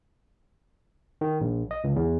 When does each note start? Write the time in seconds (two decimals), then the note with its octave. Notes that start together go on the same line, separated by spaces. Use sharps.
1.21 D#3
1.41 A#1
1.71 D#5
1.84 C#2
1.96 E2